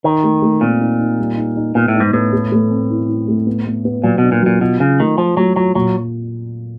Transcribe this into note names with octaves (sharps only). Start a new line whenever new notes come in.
D#3 D#4
A3
A3
A#2 C4
D#4
D#4
G3
D#4
D#4
A#2 B3
A2
D#4
G#2
A2 B3
A3
A3
C4
E4
E4
A3
B3
B3
B3
A#2 F#3
B2 D4
A#2
A#2 F#3
B2 F4
C#3 F4
D#3 A3
F3 F4
F#3 A3
F#3 F4
A#2 F#3